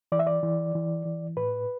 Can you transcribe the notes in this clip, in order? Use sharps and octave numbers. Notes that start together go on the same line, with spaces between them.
E3 D5
E5
D5
E3
E3
E3
A2 B4